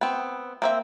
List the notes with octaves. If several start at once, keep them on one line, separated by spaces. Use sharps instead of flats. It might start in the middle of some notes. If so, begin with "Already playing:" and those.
B3 C4
A#3 C4 E5